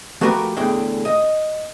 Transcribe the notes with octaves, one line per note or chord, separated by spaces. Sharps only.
F3 A3 F#4 G4 A#4 B4
E2 A2 D3 G#4 G5
D#5